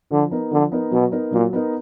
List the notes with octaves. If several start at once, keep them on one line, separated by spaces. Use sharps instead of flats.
D3 F3
B3 D#4 A#4
D3 F3
B3 D#4 A#4
B2 F#3
B3 D#4 A#4
A#2 F#3
B3 D#4 A#4